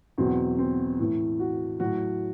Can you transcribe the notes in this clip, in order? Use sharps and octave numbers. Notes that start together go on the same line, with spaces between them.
E2 B2 F#3 C4
C4
A2 E3
F#4
A2 F#3 F#4